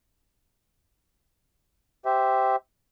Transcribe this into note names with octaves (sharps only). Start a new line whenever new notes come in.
G4 C5 E5